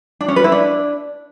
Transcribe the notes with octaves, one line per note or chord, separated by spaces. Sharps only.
D4
C#4
B4
E4
D4